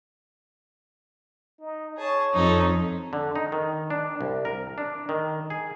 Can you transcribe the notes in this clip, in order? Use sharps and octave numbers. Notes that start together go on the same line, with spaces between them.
D#4
G#4 C#5 A5
F2 D#4 A4
D3
D#4
D#3
D4
C2
A#4
D4
D#3
G#4